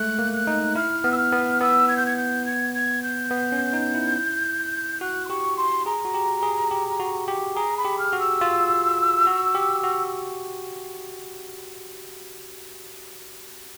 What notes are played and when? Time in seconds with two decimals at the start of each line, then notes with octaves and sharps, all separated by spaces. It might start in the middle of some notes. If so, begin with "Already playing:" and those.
Already playing: G#3 A3 F#6
0.19 A#3
0.34 F#6
0.47 D#4
0.75 E4 F6
1.04 B3
1.12 E6
1.17 F6
1.33 B3
1.61 B3 E6
1.89 G#6
1.97 G6
2.06 G#6
2.17 G6
2.46 G#6
2.74 G#6
3.03 G6
3.31 B3
3.52 C#4
3.73 D#4
3.95 E4
5.01 F#4 F#6
5.26 C6
5.29 G4 C#6
5.57 C6
5.86 G#4 A#5
6.05 F#4
6.14 G4
6.43 G#4
6.71 G4
7.00 F#4
7.28 G4
7.56 G#4 A#5
7.78 B5
7.85 G4
7.99 F6
8.13 F#4
8.20 E6
8.41 F4
9.27 F#4
9.55 G4
9.84 F#4